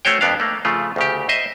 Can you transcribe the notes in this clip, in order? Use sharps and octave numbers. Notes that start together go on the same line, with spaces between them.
A3 C#4 F#4 C5 C#5 G5
F2 B3 D4 F5
A3 A#3
C#3 F3 A3 F4
D2 C#3 G4
C5 D#5 E5